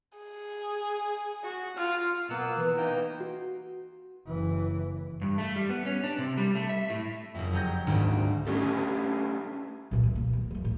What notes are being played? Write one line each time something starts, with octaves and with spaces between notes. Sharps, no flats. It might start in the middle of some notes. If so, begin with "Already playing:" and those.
G#4
F#4
F4 F6
B2 F#3 A#3 B3 E6
E3 B4
A#3 D#4 G5
F#4
F#1 E3
G2
A3
G3
B3
C#4
D4
C3
G3
A3
E5
A2
F#1 F2
F#3 G4 G#4 A#5 G6 A#6
D#1 G#1 D2 G#2 D#3 D7
A3 C#4 D4 G4 A4
A#2 E3
G2
A#3
D#2
F#1 E3
A2